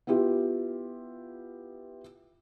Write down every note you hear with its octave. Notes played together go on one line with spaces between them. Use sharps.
B3 E4 F4 G4